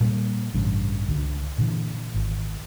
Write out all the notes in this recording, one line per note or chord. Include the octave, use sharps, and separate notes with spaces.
A#2 G3 A#3
A1 G2 C#3
C#2 D3
A#2 D3 E3
G#1